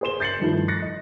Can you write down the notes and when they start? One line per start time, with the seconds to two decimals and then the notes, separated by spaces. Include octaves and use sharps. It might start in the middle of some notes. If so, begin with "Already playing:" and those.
0.01 G#4 A#4 C5 C6 E7 G7
0.20 G6 A6 C7 C#7 F#7
0.40 G2 D#3 F3 A3 E4
0.68 F#6 A6 A#6 C7 C#7
0.82 D#5